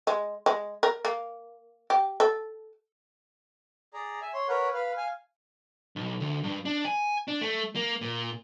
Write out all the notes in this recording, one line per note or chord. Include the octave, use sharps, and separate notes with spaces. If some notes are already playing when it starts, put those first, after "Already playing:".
G#3
G#3
A#4
A#3
G4
A4
G#4 D5 A#5
E5 G#5
C#5 C6
A#4 B4 C#5 F#5
B4 F5
F5 G#5
B1
D2
G2
D4
G#5
D4
A3
A#3
A#2